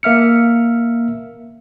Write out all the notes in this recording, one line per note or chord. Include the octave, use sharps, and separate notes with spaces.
A#3 E5 F6 C#7